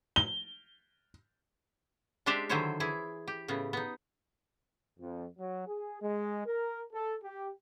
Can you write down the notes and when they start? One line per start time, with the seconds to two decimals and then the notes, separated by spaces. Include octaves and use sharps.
0.16 G7
2.26 G#3 D4 G4 C5 D5 E5
2.49 D3 D#3 F#3 E4 C5 C#5
2.80 E3 E4 G#4
3.28 G4
3.48 A2 C#3 B3
3.73 B3 D#4
4.99 F2
5.38 F#3
5.67 G#4
6.01 G#3
6.47 A#4
6.92 A4
7.23 G4